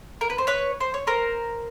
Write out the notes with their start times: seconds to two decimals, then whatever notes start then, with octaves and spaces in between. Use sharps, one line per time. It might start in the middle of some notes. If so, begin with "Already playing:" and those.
0.21 A#4
0.30 B4
0.38 C5
0.47 B4 C#5
0.80 C5
0.94 C#5
1.07 A#4 C5